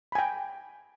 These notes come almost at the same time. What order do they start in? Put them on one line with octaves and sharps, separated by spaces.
B5 G#5 G5